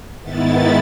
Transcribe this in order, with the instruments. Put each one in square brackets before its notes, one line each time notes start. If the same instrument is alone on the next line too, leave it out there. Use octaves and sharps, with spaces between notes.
[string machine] G#2 D#3 B3 E4 A6